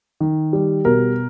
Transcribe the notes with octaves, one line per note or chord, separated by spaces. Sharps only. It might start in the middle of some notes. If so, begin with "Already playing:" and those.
D#3
G3
B2 A#4